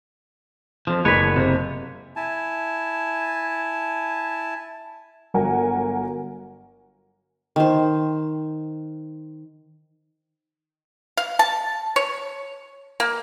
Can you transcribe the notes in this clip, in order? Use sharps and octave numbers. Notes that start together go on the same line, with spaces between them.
F2 F3
F#1 D4 B4 C#5 B6
B3
C3 A#3
E4 G#5 A5
G1 F#3 A#4 F#5 G#5
D#3 C5
F5
A5
C#5
A#3